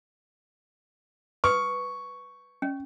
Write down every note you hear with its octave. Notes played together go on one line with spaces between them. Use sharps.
B4 C#6 D#6
C#4